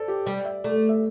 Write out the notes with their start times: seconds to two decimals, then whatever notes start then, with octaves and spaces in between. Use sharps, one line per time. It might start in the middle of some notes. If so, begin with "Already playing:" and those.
Already playing: A4 C5 D5
0.08 G4
0.26 G3 D5
0.45 E5
0.64 A3 D5
0.76 D5
0.89 E5